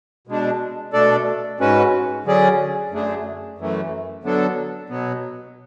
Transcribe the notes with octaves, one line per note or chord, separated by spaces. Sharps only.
B2 G#3 D4
B2 A3 D4 A4 D5
G#2 G#3 C#4 F#4 B4
D3 F#3 C#4 G#4 D5
F#2 D3 A3 D4 G#4
F#2 E3 A3
D3 F#3 B3 D4 A4
B2 F#3 B3